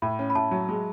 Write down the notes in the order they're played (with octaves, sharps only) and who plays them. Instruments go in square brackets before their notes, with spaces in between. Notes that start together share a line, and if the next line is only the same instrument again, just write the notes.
[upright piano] A2 [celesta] B5
[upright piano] C#4
[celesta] B5
[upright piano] A2 [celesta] A5
[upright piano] F#3
G#3